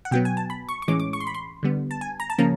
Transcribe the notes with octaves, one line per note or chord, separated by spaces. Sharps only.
F#5
B2 F#3 B3 G5
G#5
A5
B5
C#6
C#6
A2 E3 G#3 C#4 D6
D6
C#6
C6
B5
C6
D3 G3 B3
A5
G#5
A#5
A5
C#3 F3 A#3 C#4 A#5